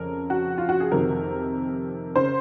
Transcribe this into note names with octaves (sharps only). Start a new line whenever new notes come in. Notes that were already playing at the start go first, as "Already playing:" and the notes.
Already playing: F2 C#3 A#4
F#4
F4
F#4
G#4
F2 C3 D#3 A#4
C#3 C5